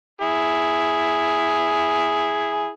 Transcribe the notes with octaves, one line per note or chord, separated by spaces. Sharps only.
E4 G#4